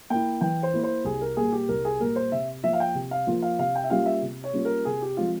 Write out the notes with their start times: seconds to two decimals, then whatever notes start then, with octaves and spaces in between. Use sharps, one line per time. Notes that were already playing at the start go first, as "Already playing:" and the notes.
0.10 A#3 E4 G5
0.41 E3 G5
0.63 C5
0.73 A#3 E4
0.84 C5
1.04 C2 G#4
1.21 A#4
1.37 A#2 G3 A#3 G#4
1.52 G4
1.69 C2 A#4
1.85 G#4
2.00 A#2 G3 A#3 A#4
2.16 C5
2.32 C3 E5
2.64 F3 A#3 F4 E5
2.73 F5
2.80 G5
2.95 C3
3.11 F5
3.27 F3 A#3 F4
3.42 F5
3.59 C3 F5
3.75 G5
3.84 E5
3.90 G3 A#3 C#4 F4 F5
4.06 E5
4.22 C3
4.44 C#5
4.53 G3 A#3 C#4 F4
4.65 A#4
4.85 C3 G#4
5.02 G4
5.17 F3 G#3 C4 F4